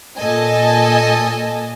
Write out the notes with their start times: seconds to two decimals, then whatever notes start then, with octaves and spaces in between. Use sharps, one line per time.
0.17 A#2 A4 D#5 G#5